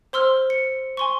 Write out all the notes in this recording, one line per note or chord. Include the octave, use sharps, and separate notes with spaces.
C5 C6 E6 F6
C#7
G#5 C6 C#6